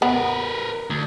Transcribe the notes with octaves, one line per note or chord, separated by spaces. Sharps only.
B3 A#4 B4
D2